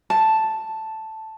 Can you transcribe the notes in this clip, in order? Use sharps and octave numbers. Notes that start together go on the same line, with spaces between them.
A5